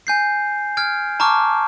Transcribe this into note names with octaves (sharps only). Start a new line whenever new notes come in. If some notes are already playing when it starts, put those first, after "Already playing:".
G#5 G6 C7
F6 G#6 D7
A5 A#5 C#6 D6 F6